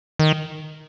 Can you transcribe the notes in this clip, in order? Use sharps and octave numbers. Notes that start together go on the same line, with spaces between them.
D#3